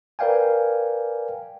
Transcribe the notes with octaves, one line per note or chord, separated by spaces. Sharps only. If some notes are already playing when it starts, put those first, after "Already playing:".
A#4 B4 D5 F5 G5 G#5